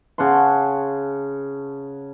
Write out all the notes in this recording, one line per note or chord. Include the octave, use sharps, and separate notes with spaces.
C#3 F#5 A5 C6